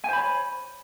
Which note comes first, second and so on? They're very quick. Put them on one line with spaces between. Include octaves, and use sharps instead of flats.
G#5 C5 B5 C#5